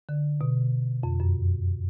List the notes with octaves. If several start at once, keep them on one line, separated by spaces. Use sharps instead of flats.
D3
B2
F2
F#2